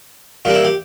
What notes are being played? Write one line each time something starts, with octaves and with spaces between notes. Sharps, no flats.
A#2 G3 A#3 D4 F4
E4
G4